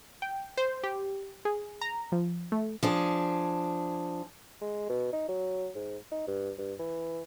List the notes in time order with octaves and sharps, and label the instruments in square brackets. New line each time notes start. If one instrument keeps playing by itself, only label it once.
[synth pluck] G5
C5
G4
G#4
A#5
F3
A3
[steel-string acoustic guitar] F3 D4 G#4
[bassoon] G#3
B2
D#4
F#3
G#2
D#4
G2
G2
E3